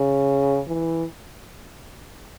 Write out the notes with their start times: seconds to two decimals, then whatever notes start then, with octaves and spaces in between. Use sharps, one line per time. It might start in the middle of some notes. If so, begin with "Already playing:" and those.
Already playing: C#3
0.67 E3